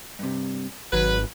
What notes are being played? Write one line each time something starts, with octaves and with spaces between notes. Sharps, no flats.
G2 C3
G#1 F#3 B4